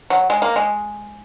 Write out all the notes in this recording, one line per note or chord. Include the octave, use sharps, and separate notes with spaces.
F#3
G#3
A#3
G#3